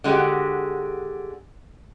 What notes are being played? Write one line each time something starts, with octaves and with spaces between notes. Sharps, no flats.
D3 G#3 F#4 G4